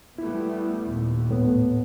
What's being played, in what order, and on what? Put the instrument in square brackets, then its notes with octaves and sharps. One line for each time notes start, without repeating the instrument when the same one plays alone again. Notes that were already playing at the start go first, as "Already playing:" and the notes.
[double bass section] G3 A3 B3 [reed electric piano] E4
[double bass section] D#2 A#2
[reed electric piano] A2 B3